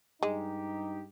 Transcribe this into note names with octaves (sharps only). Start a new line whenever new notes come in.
G2 G#3 D#4 G4